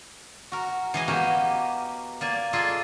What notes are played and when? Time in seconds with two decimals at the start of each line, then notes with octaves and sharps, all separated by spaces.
0.52 F#4 A#4
0.94 E3 G#4 D#5
1.08 A#3 B3 F#4 G4 A#4
2.21 A#3 D5 G#5
2.53 F4 G#4 A4 D5 D#5